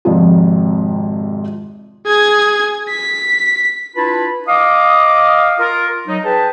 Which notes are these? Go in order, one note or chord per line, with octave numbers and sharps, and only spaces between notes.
G#1 F2 C3 F3
G#4 G#6
B6
D4 E4 F4 B4 A5 B5
D#5 F5 D6 D#6
F4 A#4
F#3 D#4
G#4 B4 G5 A5